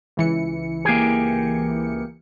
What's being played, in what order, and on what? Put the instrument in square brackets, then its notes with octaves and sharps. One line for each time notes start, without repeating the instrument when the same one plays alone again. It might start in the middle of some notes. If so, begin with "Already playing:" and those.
[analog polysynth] C#2 E3 C#7
[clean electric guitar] A#3 G4 G#4